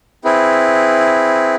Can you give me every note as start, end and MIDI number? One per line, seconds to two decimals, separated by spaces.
0.25 1.56 60
0.25 1.56 64
0.25 1.56 68
0.25 1.56 71